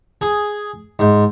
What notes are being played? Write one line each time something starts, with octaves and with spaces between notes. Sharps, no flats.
G#4
G#2